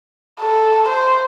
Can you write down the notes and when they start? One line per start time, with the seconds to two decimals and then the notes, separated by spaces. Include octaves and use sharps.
0.40 A4
0.89 C5